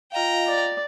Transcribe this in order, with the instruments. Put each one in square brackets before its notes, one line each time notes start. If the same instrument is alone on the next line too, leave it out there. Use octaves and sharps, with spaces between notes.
[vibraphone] F4 D#5 F5 [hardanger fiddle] G5 A#5
[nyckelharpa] D5